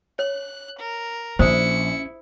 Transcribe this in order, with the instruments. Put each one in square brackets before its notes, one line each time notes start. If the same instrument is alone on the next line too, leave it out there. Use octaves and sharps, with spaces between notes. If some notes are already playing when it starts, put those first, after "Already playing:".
[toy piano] C#5 [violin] F#6
[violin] A#4
[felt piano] A#1 [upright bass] C#4 [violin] E4 C#7 [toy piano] C5 D#6